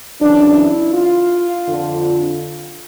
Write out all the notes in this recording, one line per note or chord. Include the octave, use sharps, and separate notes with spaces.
F#2 C#3 E3 D4
E4
F4
F2 D3